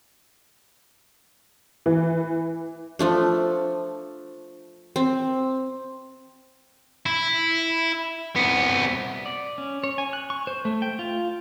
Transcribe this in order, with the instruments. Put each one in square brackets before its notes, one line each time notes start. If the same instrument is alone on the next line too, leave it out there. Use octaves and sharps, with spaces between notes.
[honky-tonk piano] E3
[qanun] F3 A3 D4
C4
[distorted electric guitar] E4
C2 B3
[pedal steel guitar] D5
C#4
C#5
G#5
F#6
C#6
C5
A3
G5
F4